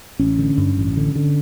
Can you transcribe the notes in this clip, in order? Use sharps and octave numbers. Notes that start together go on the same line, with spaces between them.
A1 C#4
D3
G2
A1
D3
D3